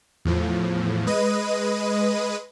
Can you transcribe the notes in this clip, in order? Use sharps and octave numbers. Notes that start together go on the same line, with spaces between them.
E2 A2 F3
G#3 B4 D#5 D#7